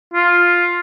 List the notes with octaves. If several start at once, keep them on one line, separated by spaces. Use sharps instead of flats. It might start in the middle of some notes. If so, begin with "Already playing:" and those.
F4